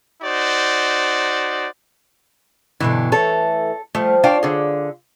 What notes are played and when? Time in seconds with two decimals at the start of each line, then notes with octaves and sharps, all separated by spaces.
0.23 D#4 F#4 C5 D5
2.80 G2 B2 D3 E3
3.12 E3 A3 A4 C#5
3.95 F3 G3 A3
4.24 D4 F4 C#5 F5 G5
4.43 D3 G#4